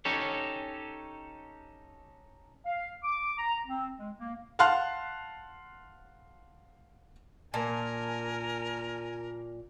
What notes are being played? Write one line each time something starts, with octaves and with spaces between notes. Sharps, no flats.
C#4 D#4 G4 A4 C#5
F5
D6
A#5
C4
G#3
A#3
F5 F#5 A5 C6 F6 F#6
A#2 A#3 A#4 G#5 A5